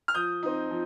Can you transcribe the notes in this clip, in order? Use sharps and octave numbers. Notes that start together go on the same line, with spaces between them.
F6
F3 D#6 G6
C4 D#4
F3